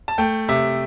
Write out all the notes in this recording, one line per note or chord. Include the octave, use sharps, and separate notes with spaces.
A5
A3 G5
C3 E5